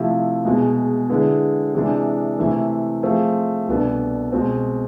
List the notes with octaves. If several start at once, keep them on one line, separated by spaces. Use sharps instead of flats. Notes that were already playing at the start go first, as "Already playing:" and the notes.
Already playing: C3 F3 A3 E4
E2 B2 G#3
D3 G#3 B3 E4 G#4
C3 E3 G#3 D4
C3 E3 A3
F3 A3 C4 G#4 C5
C2 B2 B3 D4 A4
B2 G#3 C4